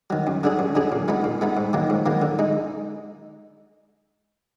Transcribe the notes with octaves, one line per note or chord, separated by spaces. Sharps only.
D#3 F#3
F#2
D3 F#3 D4 G#4
F#2
D3 F#3 D4 G#4
A#2
G#3 B3 D#4
A#2
G#3 B3 D#4
G#2
D#3 F#3 A#3
G#2
D#3 F#3 A#3
D3
G#3 D#4